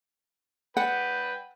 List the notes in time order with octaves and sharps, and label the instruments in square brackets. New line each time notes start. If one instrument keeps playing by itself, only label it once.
[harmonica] B4 G5 [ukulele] F#5